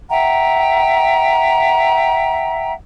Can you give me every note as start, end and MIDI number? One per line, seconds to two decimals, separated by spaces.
0.10 2.73 76
0.10 2.73 78
0.10 2.73 79
0.10 2.73 82